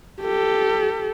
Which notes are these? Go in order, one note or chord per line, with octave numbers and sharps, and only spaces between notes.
G4 A4